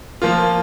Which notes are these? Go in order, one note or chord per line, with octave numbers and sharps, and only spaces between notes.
F3 A#3 F4